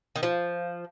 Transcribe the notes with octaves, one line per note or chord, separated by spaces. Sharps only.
D#3
F3